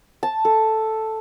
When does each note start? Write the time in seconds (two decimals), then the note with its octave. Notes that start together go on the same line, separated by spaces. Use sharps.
0.23 A5
0.45 A4